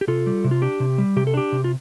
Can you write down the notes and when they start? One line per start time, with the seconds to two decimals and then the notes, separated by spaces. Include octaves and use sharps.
0.01 G4
0.08 C3 F4 A4
0.26 G3
0.44 C3
0.51 F4
0.62 D4 G4
0.80 C3
0.98 G3
1.16 C3 G4
1.27 A4
1.34 D4 G4
1.52 C3
1.64 F4